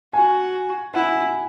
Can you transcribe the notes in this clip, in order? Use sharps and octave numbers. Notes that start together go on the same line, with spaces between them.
F#4 G#5
E4 F#5